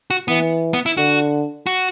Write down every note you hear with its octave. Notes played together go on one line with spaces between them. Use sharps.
F#4
E3 B3
B3
E4
D3 F#4
F#4